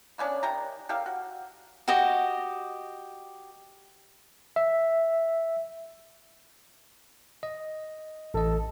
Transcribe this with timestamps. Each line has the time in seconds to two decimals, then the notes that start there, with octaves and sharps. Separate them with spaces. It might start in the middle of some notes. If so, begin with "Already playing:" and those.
0.18 A#3 B3 C#4 D4
0.43 D#3 G4 A#5
0.89 G4 A4 A#4 F5
1.06 F#4
1.88 F#4 G4 D#5
4.56 E5
7.43 D#5
8.34 A1 A4 D#5